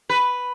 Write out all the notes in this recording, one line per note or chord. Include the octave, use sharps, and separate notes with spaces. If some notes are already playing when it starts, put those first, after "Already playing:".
B4